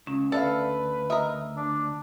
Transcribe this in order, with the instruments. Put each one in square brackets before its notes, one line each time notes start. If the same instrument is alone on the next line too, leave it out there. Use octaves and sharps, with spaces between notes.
[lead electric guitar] C#2 [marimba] C#4
[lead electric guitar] D2 [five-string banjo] A4 E5 F5 [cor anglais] B4 [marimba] D5
[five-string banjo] A#4 E5 [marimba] D#5 D#6
[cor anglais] D4